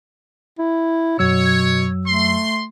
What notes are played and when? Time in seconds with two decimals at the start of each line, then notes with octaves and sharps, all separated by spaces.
0.59 E4
1.19 F#2 B2 F#3 C#5 E6
2.07 A3 C6